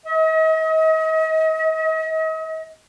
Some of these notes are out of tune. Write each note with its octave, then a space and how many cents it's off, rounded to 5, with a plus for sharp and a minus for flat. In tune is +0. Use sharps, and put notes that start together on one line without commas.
D#5 +40